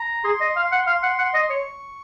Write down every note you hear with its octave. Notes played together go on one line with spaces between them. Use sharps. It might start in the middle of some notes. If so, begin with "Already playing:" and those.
Already playing: A#5
G#4 C6
D#5
F5
F#5
F5 C6
F#5
F#5
D#5
C#5 C#6